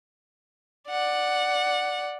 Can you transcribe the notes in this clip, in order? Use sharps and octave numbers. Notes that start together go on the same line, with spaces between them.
D5 F#5